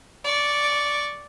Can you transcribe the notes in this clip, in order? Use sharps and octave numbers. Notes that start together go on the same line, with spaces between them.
D5 C#6